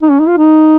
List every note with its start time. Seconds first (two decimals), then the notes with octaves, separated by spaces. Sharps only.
0.02 D#4
0.11 C#4
0.20 D#4
0.28 F4
0.37 D#4